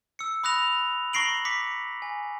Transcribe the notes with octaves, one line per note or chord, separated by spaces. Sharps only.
E6 C#7
B5 D#6 F#6 A#6 F7
A#5 C#6 A#6 C7 D7 F#7
D6 B6 C#7
G#5